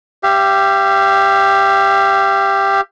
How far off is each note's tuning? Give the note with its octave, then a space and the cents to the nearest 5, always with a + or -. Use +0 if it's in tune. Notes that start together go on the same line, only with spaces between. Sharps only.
G4 +5 F5 -40